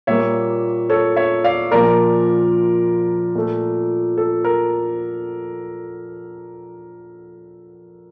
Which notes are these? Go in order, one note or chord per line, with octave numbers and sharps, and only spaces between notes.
A#2 G3 A#3 C#5 E5
A4 C#5
C#5 E5
D5 F5
A#2 F3 A#3 A#4 D5
A#2 A3
A4
A#4